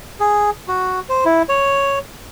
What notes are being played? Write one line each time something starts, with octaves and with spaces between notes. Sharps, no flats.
G#4
F#4
C5
E4
C#5